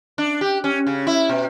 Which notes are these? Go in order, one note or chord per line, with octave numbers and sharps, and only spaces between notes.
D4
G4
C#4
C#3
E4
B2